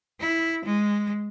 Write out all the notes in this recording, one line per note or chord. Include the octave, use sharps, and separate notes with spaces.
E4
G#3